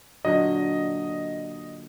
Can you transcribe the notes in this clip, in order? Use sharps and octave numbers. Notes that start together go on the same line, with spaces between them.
A#2 D3 F#3 D#5